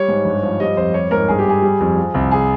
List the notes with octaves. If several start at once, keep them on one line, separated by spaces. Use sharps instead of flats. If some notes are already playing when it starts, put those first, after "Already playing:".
Already playing: G3 C#5
G#2
G2
F3
G3 D#5
F2 C5
G3 C#5
G#2 A#4
G2 G#4
G4
G3 G#4
G3
F2
F3
C2
G#4